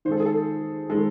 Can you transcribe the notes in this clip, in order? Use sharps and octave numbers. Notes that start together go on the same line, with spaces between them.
D#3 G#3 A4 C5
G#4
A4
D#3 G#3 A4